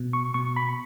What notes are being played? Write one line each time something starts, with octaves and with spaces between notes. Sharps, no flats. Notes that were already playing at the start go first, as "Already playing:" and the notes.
Already playing: B2
C#6
B2 C#6
B5